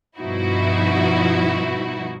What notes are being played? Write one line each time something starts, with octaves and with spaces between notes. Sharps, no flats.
G2 B2 F3 D#4 E4 F#4